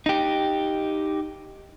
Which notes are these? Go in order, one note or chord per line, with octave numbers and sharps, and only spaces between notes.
D#4 G4